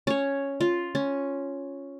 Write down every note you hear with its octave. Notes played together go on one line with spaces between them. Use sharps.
C#4 C#5
F4
C#4